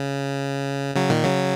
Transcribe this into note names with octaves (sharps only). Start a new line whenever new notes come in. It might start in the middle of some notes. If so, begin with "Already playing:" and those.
Already playing: C#3
C#3 F#3
A#2 D#3
C#3 F#3